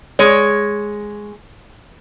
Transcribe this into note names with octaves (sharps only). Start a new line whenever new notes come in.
G#3 C#5